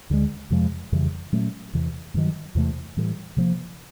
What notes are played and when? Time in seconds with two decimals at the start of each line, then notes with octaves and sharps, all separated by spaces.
0.10 D2 D3 F3 G#3
0.50 F2 C3 F3 G#3
0.92 F2 C#3 E3 G3
1.32 A#2 F#3 A3 C#4
1.73 E2 C3 E3
2.14 G2 D#3 F#3
2.55 E2 C3 E3 A3
2.97 A2 E3 G3
3.37 C3 F3 A#3